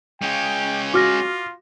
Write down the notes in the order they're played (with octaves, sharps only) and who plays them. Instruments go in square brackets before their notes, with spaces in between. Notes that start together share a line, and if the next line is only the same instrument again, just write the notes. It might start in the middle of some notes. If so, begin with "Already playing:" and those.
[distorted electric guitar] G#3 C#4 [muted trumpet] G5
[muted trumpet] F4 [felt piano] F#4 [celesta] D6 F6 A#6